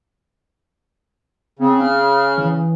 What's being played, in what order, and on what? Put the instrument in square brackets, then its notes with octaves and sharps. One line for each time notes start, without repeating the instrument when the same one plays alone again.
[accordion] C#3 [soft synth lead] C4
[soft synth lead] F6
E3